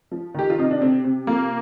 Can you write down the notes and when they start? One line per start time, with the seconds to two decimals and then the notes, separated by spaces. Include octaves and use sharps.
0.11 F3
0.34 D#3 G4
0.50 F4
0.58 C3 D#4
0.70 D4
0.81 C3 C4
1.05 C3
1.27 F3 A#3